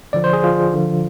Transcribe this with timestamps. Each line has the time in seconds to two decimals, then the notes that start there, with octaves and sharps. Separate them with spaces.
0.13 D3 F3 D5
0.24 C5
0.33 G#4
0.44 F4
0.73 D3 F3